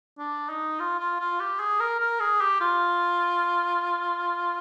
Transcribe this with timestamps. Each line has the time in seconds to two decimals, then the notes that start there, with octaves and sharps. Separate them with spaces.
0.19 D4
0.49 D#4
0.80 F4
1.00 F4
1.20 F4
1.40 G4
1.60 G#4
1.80 A#4
2.00 A#4
2.20 G#4
2.41 G4
2.61 F4